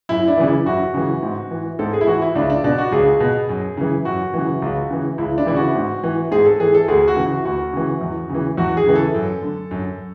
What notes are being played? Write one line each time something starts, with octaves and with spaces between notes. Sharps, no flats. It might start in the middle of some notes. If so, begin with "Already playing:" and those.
F#2 E4
D4
C#3 E3
E4
F#2 F#4
C#3 E3
G#2
E3
G#2 A4
G#4
E4
E3 F#4
E4
C#2 D4
D4
B2 D4
F#4
C#2 G#4
B2
F#2
C#3 E3
F#2 F#4
C#3 E3
C#2
C#3 E3
C#2 E4
D4
C#3 E3 E4
F#4
G#2
E3
G#2 G#4
A4
E3 G#4
A4
D2 G#4
F#4
C#3 E3
F#4
D2 F#4
C#3 E3
E2
C#3
E3
E2 F#4
G#4
C#3 E3
A4
F#2
D3
F#2